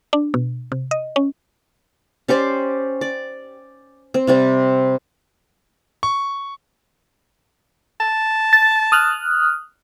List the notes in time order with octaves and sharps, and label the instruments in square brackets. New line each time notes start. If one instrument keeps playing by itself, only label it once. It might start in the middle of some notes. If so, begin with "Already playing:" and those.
[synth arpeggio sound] D4
B2
C3
D#5
C#4
[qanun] C#4 G4 C5 D5
D5
C4
C3 G3 C4
[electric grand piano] C#6
[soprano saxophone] A5
[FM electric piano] A6
D#6 F6 F#6